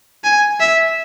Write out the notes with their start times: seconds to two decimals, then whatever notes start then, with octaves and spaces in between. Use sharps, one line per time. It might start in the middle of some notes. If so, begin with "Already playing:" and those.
0.24 G#5
0.60 E5